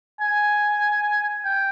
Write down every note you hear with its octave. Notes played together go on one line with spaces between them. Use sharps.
G#5
G5